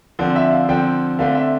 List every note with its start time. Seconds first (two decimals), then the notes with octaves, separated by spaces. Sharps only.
0.19 D3 F3 C4
0.36 E5
0.52 F5
0.69 D3 F3 C4 G5
1.19 D3 A3 C4 F5
1.35 E5